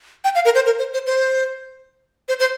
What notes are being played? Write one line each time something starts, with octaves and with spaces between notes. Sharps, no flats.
G5
F5
A#4
C5
A#4
C5
C5
C5
C5
C5